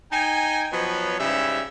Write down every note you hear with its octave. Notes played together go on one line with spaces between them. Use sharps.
D#4 G5 G#5
F3 F#3 B3 B4 C#5 D#5
G#2 C#3 G3 E4 G4 E5